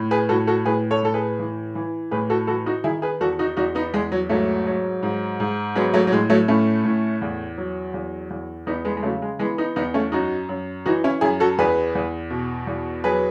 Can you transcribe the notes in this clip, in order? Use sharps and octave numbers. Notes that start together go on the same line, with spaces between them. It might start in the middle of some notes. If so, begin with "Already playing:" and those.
Already playing: A2
G#4 B4
A2 F#4 A4
F#4 A4
A2 G#4 B4
A4 C#5
A2 A4
G#4 B4
E3
E3
A2 G#4 B4
F#4 A4
E3 F#4 A4
D#4 F#4
D#3 E4 G#4
G#4 B4
E2 F#4 A4
D#4 F#4
E2 D#4 F#4
B3 D#4
E2 G#3
F#3
G#2 F#3 A3
F#3
G#2
G#2
F#3 G#3 B3
F#3 A3
F#3
A2 G#3
F#3 A3
A2 A3 C#4
A2
E2
F#3
E2
E2
E2 B3 D#4
G#3 B3
G#3
C#3 F#3 A3
G#3
E3 G#3 B3
B3 D#4
E2 B3 D#4
A3 C#4
F#2 D#4 F#4
F#2
E3 D#4 F#4
C#4 E4
F#2 E4 G#4
F#4 A4
E2 G#4 B4
E2
B2
E2
F#3 G#4 B4